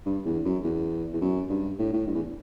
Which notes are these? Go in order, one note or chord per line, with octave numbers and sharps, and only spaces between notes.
G2
E2
F#2
E2
E2
F#2
G2
A2
A2
G2
E2